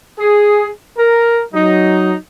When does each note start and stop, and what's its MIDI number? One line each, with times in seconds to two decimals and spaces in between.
0.18 0.66 68
0.97 1.41 70
1.54 2.13 54
1.54 2.13 63